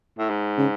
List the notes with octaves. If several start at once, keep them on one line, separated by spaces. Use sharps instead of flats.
A2
G#2
C#3